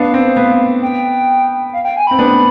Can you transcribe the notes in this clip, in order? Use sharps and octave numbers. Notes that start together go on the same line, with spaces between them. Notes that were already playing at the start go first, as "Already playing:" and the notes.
Already playing: B3 D4 F5
C4
B3
G5
F5
G5
G#5
C4 B5
B3 D4